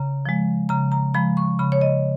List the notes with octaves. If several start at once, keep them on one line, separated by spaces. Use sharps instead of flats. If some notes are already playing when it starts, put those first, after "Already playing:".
Already playing: C#3 A#5
F3 G#3
C#3 A#5
A#5
F3 G#3 B5
C#6
C#3 B5
C#5
D#5